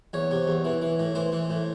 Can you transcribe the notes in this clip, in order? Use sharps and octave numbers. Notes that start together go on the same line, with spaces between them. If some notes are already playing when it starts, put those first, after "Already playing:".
E2 C#5
C3
E2
E3
E3
A2
E3 C5
E3
A2